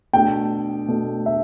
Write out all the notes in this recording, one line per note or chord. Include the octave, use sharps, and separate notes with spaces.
B2 A3 D4 A4 G5
B2 A3 D4 A4
E5